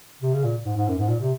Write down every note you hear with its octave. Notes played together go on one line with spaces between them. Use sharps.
C3
C#3
A#2
G#2
G#2
F#2
G#2
A#2
C3